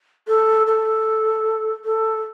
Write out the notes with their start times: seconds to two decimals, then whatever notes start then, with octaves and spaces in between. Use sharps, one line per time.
0.28 A4
0.67 A4
1.85 A4